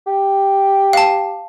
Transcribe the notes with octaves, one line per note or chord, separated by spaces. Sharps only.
G4
F5 A5